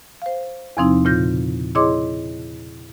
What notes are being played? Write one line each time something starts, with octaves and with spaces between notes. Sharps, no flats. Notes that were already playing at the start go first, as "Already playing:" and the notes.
C5 F5
E2 C3 F3 C4 D#4 E4
A#2 C#3 F4 G6 A#6
E4 G#4 C#5 D#5 C6 D6